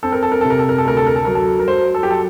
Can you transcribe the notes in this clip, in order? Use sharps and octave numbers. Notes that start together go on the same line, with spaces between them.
C4 A4
A#4
A4
A#4
C3 A4
A#4
A4
A#4
A4
D2 A#4
A4
A#4
A4
F#3 A#4
A4
A#4
F#3 C5
A4
G4
F#3 A4